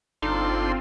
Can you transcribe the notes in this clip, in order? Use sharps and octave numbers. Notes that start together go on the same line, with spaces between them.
G1 C4 D4 D#4 F4 A4 C6